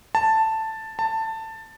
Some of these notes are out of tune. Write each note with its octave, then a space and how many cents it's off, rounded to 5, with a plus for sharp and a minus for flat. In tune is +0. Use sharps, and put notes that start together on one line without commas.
A5 +5
A5 +15